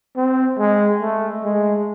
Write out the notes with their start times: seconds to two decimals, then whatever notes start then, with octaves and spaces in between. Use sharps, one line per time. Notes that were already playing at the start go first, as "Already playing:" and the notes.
0.16 C4
0.59 G#3
1.00 A3
1.44 G#3